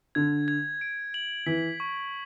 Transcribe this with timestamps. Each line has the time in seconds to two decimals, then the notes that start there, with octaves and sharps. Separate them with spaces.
0.15 D3 G#6
0.48 G#6
0.81 D7
1.14 F#7
1.46 E3 B6
1.80 C#6